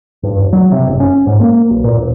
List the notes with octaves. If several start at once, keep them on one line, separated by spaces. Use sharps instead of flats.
G2
E1
F#3
C3
F#1
C#4
G#2
A#3
B1
A#2
E1